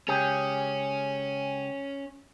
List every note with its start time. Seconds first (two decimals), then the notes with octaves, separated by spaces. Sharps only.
0.08 C#2 C#4 G4 G#4